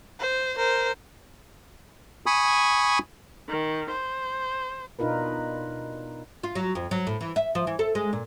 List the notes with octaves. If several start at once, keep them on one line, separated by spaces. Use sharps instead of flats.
C5
A#4 C5
G#5 B5 C#6 D#6
D#3
C5
B2 D4 D#4 F4 A#4 B4
F4
F#3
F2
F#3
A2
E3
E5
F3
E3
A4
G#3
A#2